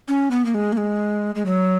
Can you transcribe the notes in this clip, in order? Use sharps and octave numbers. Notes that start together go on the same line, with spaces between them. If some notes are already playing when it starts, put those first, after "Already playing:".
C#4
B3
A#3
G#3
A#3
G#3
G#3
F#3